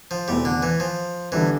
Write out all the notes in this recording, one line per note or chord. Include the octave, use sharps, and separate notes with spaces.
F3
E2 B2 G3 A3 C4
D3
E3
F3
G1 G2 D3 E3